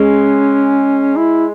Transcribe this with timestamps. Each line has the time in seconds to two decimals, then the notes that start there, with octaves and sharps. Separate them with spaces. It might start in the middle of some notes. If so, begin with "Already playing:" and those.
Already playing: G#3 C#4
1.16 E4